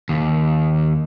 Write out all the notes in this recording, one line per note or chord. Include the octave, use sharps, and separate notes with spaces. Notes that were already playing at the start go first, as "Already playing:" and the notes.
D#2